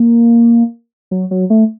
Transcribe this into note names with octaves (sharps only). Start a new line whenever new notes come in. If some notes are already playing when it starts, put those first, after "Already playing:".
Already playing: A#3
F#3
F#3
A3